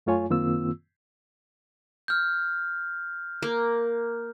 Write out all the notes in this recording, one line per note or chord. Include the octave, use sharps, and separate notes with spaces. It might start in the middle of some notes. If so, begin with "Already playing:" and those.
F#2 A3 F4 C#5 G#5
F#2 D#3 A#3 C4 F4 E6
F6 G6
A#3